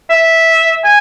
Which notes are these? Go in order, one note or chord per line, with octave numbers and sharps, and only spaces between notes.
E5
G#5